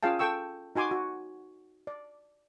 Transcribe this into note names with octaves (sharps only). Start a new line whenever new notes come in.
C#4 F4 G#4 F5 G5 A5
A4 G5 C#6 E6
D#4 F#4 G#5 C6 D6
F#4
D5